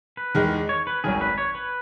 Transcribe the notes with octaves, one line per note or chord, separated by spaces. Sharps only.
B4
E2 D#3 G#3 D#4
C#5
B4
G#1 F#2 D#3 G#4
B4
C#5
B4